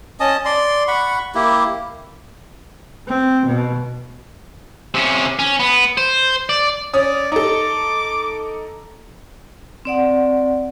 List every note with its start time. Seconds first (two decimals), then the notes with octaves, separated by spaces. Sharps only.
0.20 C#4 D#5 A5 D#6
0.45 D5 C6
0.88 F#5 B5 C#6
1.35 A#3 E4 G4
3.07 C4
3.46 B2
4.94 C3 C#4
5.39 C#4
5.60 B3
5.97 C5
6.49 D5
6.94 C#4 D5 D#6
7.32 D#4 A4 D6
9.85 C4 D5 F#5